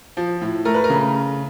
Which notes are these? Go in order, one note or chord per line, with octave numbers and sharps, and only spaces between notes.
F3
A2
A3 A#4
B4
A#4
C#3